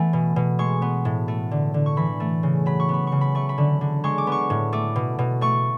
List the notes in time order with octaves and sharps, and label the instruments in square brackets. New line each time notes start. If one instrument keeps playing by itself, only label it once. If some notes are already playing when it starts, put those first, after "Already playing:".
Already playing: [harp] E3 A3 B3 G#5
B2
B2
G#3 C#6
B3
A2
A3
D3
D3
C#6
E3 B5
A3
C#3
F#3 B5
C#6
B3 B5
C#3 C#6
B5
A3 C#6
B5
D3
D3
G#3 C#6
D6
B3 C#6
A2
A3 D6
B2
B2
A3 C#6